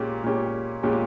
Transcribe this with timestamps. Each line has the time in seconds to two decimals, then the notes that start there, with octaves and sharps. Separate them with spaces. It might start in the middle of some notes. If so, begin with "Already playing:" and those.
Already playing: A#2 G#3 C#4 G4
0.24 A#2 G#3 C#4 G4
0.83 A#2 G#3 C#4 G4